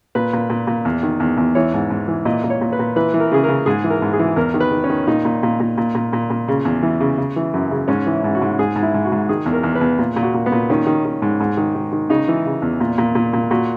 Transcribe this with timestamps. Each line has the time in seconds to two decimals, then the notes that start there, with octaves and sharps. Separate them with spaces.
0.15 A#2 B4
0.33 A#2
0.50 A#2
0.67 A#2
0.85 E2
1.03 D#3
1.20 E2
1.38 E2
1.55 E3 C#5
1.74 G#2
1.90 G#2
2.08 E3
2.25 A#2 D#5
2.44 A#2
2.50 C#5
2.61 A#2
2.73 B4
2.79 A#2
2.96 E3 B4
3.14 E3
3.20 A#4
3.32 C#3 G#4
3.44 C#3 A#4
3.66 G#2 G#4
3.84 E3
3.90 A#4
4.02 G#2
4.13 G#4
4.19 E3
4.36 E2 A#4
4.54 D#3
4.60 B4
4.72 D#3
4.84 C#4
4.90 D#3
5.07 A#2 D#4
5.25 A#2
5.43 A#2
5.60 A#2
5.78 A#2
5.95 A#2
6.13 A#2
6.30 A#2
6.48 C#3
6.65 E2
6.83 E3
7.01 C#3
7.18 C#3
7.36 E3
7.54 F#2
7.71 C#3
7.88 G#2 C#4
8.06 E3
8.12 E4
8.24 G#2
8.35 F#4
8.42 G#2
8.59 G#2 G#4
8.76 G#2
8.82 E4
8.94 G#2
9.05 F#4
9.12 G#2
9.29 D#3 G#4
9.46 E2
9.53 A#4
9.63 E2
9.75 B4
9.81 E2
9.99 A#2
10.16 A#2
10.22 F#4
10.34 A#2
10.46 B3
10.52 A#2
10.70 D#3 C#4
10.86 D#3
11.05 D#3
11.22 G#2
11.40 G#2
11.57 D#3
11.75 D#3
11.92 D#3
12.09 C#3 D#4
12.28 E3
12.46 C#3
12.62 E2
12.80 A#2
12.98 A#2
13.15 A#2
13.33 A#2
13.51 A#2 F#4